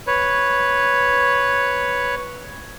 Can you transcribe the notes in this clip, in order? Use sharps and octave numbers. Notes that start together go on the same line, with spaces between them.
B4 C#5